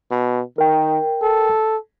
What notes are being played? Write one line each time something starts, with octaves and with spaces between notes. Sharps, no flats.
B2
D#3 A#4 G5
A4